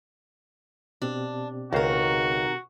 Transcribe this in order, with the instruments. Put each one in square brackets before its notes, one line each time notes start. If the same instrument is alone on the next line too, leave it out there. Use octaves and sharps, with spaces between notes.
[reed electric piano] B2 C4 G4 [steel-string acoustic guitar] D4
[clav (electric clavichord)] C#2 C5 [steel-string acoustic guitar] D#3 A#4 [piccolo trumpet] F#4